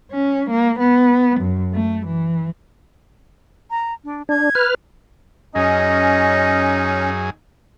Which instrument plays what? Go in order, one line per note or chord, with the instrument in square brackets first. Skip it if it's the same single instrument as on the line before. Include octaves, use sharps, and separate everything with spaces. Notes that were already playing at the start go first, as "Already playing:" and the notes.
[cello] C#4
A#3
B3
F#2
A3
E3
[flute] A#5
D4
[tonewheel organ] D4 [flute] G#6
[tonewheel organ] B4 F6
[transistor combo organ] F#2 G#4 [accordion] C#4 [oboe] D#4 [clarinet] D#5